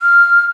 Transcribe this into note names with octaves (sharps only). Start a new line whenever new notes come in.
F6